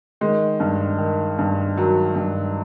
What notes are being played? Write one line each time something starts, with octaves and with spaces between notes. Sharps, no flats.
D#3 G#3
G2
D#3
G2
D#3 F#3
G2